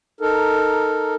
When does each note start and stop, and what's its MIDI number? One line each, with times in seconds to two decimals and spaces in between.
0.21 1.15 63
0.21 1.15 69
0.21 1.15 70